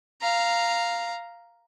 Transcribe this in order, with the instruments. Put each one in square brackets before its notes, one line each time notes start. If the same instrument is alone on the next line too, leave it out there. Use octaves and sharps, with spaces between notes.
[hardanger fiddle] F5 A#5